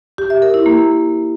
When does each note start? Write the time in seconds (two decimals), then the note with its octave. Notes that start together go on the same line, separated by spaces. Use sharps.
0.18 G4
0.30 E5
0.42 A#4
0.54 E4
0.66 A#3